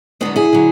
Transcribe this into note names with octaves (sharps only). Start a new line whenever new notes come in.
E2 D3 F#3 G#3 B3
E4 G#4
D3 F#3